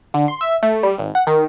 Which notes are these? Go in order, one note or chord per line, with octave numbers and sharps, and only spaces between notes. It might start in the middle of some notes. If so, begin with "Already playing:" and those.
D3
C6
E5
A3
G3
G#1
F#5
D#3